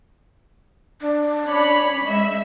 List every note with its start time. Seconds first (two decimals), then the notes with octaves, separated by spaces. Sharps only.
1.01 D4
1.45 C#4 C#5 B5
2.06 G#3 D#5 E5